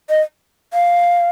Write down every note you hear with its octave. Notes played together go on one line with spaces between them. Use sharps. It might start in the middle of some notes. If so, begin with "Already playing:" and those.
D#5
F5